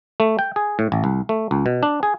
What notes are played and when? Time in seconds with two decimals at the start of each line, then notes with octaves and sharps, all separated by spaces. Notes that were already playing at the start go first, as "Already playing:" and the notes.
0.20 A3
0.39 G5
0.56 G#4
0.79 A2
0.92 A1
1.04 C2
1.29 A3
1.51 C#2
1.66 B2
1.83 D4
2.03 G#4